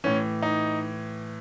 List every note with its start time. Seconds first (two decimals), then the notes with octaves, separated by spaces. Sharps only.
0.04 A2 E3 C#4
0.42 D#4